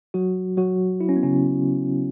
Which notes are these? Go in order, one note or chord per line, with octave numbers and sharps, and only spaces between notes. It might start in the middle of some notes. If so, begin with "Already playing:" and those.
F#3 F#4
F#3 F#4
E4
C#4
B3
C#3 C#4